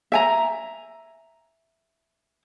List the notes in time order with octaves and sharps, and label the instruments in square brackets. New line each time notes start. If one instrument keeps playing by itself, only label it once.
[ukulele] E5 G#5 A#5